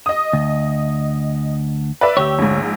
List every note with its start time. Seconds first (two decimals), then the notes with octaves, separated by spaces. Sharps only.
0.06 D#5 D#6
0.33 D2
2.01 B4 D5 E5
2.17 D2 G4 C#5 E6
2.38 A#1 G#2